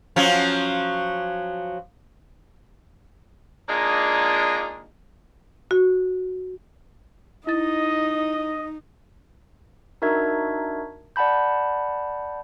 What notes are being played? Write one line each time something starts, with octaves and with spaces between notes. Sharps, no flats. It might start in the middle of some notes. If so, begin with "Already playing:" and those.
F3 F#3 C#4
G#3 A#3 D4 D#4 F4 G#4
F#4
D#4 E4 D#5 A6
D4 D#4 F#4 A#4 E5 G#6
D5 F#5 A5 B5 G6